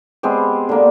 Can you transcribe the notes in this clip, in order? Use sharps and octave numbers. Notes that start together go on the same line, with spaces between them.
G#3 B3 C4 G4
D3 A#3